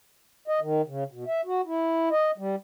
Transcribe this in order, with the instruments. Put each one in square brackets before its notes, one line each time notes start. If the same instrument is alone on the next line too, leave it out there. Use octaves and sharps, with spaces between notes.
[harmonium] D#5
D#3
C#3
B2
E5
F#4
E4
D#5
G3